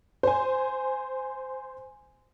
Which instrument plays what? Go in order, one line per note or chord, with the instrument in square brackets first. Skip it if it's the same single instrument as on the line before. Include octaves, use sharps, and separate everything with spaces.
[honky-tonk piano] C5 G#5